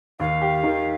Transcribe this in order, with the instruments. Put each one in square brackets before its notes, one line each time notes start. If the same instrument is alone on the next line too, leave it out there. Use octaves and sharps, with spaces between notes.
[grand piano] D#2 [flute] F5
[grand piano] G4
D#3